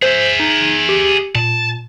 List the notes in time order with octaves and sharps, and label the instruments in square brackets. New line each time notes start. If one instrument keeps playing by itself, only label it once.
[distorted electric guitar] G#4 E5 [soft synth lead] C5
[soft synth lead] D#4
G4
[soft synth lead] A#2 [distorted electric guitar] A5